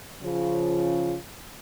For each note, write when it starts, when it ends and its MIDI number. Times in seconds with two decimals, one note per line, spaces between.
0.23 1.15 49
0.23 1.15 53
0.23 1.15 65